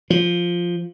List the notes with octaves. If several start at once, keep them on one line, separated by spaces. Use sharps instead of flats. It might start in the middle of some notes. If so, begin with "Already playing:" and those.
F3